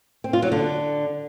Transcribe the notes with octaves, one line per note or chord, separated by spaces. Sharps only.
C4
F4
F#3
D3